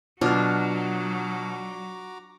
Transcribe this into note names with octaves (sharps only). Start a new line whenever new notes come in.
B2 F#3 D4 F4 F#4 A#5 D6 F6